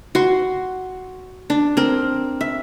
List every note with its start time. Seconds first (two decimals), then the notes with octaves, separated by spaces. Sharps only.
0.15 F#4 C6
1.50 D4
1.77 C4 A#4
2.41 E5